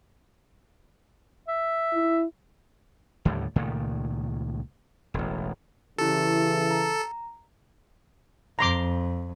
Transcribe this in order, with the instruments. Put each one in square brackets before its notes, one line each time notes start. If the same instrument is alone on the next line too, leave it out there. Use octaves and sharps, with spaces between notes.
[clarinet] E5
[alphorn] E4
[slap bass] D#2 A2 D3 G3
C#2 A#2 D#3 A3
E1 A1
[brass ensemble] C#3 E3 [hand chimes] E4 G4 [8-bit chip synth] A4
[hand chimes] A#5
[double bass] F2 [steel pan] A#5 C6 D6